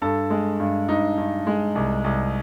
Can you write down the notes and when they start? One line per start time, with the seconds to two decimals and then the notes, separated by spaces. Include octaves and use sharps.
0.02 G2 A4
0.30 G#3
0.60 G2
0.88 G2 D#4
1.18 G2
1.47 G#3
1.75 C2
2.04 C2